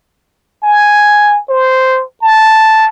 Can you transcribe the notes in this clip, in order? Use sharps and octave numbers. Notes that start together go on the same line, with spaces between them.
G#5
C5
A5